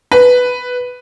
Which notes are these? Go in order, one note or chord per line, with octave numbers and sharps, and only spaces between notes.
B4